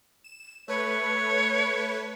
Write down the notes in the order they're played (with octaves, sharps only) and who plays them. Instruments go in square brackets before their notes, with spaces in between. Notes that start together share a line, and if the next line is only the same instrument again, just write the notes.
[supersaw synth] E7
[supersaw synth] A3 B4 [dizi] C#5